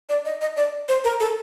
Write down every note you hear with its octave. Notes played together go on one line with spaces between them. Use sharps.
D5
D#5
D#5
D5
C5
A#4
A4